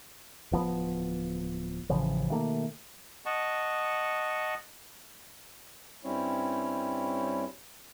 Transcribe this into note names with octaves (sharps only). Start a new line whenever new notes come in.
D1 F3 B3
A1 C#3 E3 F3
B2 D#3 A3 A#3
D#5 F#5 A5 C#6
G2 G3 C4 C#4 E4 C#5